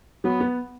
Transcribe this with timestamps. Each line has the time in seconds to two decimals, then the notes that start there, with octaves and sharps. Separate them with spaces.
0.24 F#3 B3
0.40 B3